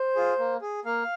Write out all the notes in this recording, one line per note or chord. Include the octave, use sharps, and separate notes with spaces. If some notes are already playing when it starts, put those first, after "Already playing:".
Already playing: C5
F4 G#4
A#3
G#4
A#3 F5